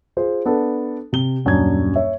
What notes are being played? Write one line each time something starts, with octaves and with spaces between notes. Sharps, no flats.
F4 G#4 C5
B3 D4 A4
C3 G7
D#1 F#2 D4 G#6
C#5 E5